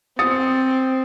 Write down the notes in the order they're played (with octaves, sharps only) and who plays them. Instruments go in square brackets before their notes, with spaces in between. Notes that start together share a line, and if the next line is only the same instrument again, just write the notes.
[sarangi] C4 [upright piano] D#6 A6 C#7